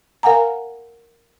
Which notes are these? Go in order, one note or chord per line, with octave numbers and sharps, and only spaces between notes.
A#4 F5 F#5 G#5 A#5